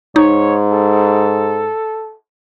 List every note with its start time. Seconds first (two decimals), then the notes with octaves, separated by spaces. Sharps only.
0.16 G#2 D#4 C#5
0.71 A4